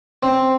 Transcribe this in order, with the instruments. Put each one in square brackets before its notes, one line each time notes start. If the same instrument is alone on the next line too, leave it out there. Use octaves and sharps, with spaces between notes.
[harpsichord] C4